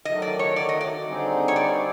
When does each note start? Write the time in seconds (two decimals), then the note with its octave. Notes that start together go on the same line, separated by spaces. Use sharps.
0.05 D#3 F#3 A3 D#5
0.22 D5
0.39 C#5
0.56 D5
0.69 D#5
0.81 D5
1.06 D3 G3 C4 D#4 G#4
1.48 C#5
1.56 D5